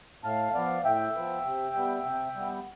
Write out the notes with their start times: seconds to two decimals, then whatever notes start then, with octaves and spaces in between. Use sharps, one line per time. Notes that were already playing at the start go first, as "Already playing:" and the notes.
0.24 A2 F5 A5
0.54 F3 B3 D5 F5
0.85 A2 E5 G5
1.15 F3 B3
1.45 C3
1.75 G3 B3
2.05 C3
2.35 G3 B3